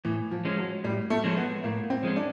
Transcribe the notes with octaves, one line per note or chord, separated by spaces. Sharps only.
A2 E3
F3
F3 G#3 C#4
F#3
A2 G3
A3
F3 G#3 C#4
B3
A2 A#3
C4
F3 G#3 C#4
D4